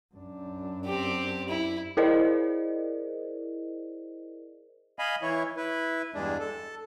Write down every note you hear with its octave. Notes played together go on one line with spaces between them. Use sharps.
F#2 D4
C4 G4
E4
E4 G#4 A#4 C5 D5 D#5
D#5 F5 G#5 B5
E3 E4 C#5
E4 B4
E2 G2 G#3 D4
A4